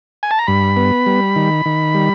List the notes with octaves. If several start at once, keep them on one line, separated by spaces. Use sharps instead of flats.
G#5
A5
A#5
G2 B5
B3
G3
D#3
D#3
G3